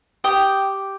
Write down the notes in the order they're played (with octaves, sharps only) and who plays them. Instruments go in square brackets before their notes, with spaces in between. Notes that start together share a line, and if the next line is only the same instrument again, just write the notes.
[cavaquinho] G4 G5 D#6